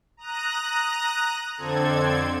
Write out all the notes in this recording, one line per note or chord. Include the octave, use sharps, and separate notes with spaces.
A#5 D#6 F#6 A#6
F2 D3 C4 A4 G#6